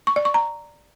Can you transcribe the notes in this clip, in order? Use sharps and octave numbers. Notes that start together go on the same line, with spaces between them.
C#6
D5
C#6
A#5